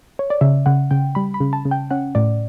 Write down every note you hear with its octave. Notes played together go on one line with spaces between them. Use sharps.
C#5
D5
C#3 E5
C#3 F#5
C#3 G5
G3 B5
B5
C#3
A5
C#3
G5
C#4 F#5
A2 D5